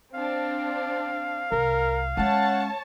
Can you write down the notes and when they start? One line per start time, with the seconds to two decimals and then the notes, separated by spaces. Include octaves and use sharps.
0.14 C4 D4 F5
1.52 C2 A#4
2.17 G#3 C#4 C#5 F#5 A5